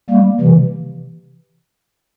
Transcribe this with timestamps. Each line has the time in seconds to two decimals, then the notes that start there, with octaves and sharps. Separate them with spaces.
0.10 G3 A#3
0.40 C3 E3